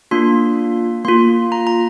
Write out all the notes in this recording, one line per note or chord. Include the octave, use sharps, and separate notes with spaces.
A#3 D4 F4 C6
A#3 F4 C6
A#5
A#5